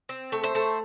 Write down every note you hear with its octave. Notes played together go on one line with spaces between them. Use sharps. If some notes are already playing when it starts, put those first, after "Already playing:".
C4
A3
C5 E5
A3